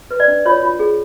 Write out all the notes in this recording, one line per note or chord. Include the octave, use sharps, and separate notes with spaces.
B4
D5
D4
F4 C#5
F4
G#4